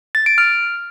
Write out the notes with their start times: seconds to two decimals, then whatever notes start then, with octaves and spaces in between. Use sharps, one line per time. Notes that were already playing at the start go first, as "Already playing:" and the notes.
0.15 A6
0.26 D7
0.38 F6